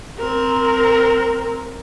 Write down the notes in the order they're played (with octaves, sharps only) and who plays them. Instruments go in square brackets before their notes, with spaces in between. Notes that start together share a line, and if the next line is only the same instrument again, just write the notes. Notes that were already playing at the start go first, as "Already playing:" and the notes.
[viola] C4 A#4